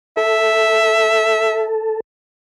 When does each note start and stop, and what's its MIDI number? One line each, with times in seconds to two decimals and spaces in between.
0.17 2.00 69
0.17 1.69 76